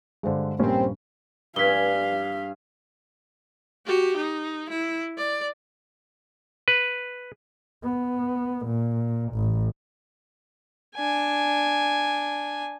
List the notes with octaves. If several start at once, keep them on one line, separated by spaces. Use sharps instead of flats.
G2 D3 G#3 C5
A#1 G2 G3 A#3 C4 C#4
G2 F5 G#5 B6 G7
F#4 G4
D#4
E4
D5
B4
B3
A#2
A1
D4 G#5